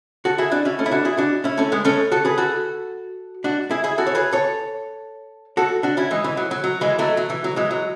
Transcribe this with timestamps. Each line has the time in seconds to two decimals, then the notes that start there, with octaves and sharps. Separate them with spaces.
0.25 F#4 A4
0.38 E4 G#4
0.52 D4 F#4
0.65 C#4 E4
0.79 A3 C#4
0.86 E4
0.91 D4 F#4
1.05 E4 G#4
1.18 D4 F#4
1.44 C#4 E4
1.57 A3 C#4
1.72 G#3 B3
1.85 A3 C#4
2.12 F#4 A4
2.25 G#4 B4
2.38 F#4 A4
3.44 D4 F#4
3.71 E4 G#4
3.84 E4 G#4
3.98 F#4 A4
4.07 C#5
4.15 G#4 B4
4.32 A4 C#5
5.57 F#4 A4
5.83 D4 F#4
5.97 C#4 E4
6.11 E3 G#3
6.24 E3
6.37 F#3
6.51 F#3
6.64 F#3
6.81 E3 G#3
6.99 F#3 A3
7.17 F#3
7.30 E3
7.44 F#3
7.56 E3 G#3
7.71 F#3